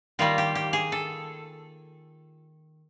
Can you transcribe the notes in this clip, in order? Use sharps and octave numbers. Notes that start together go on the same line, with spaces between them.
D#3 G3 A#3 F4
G4
G4
G#4
A4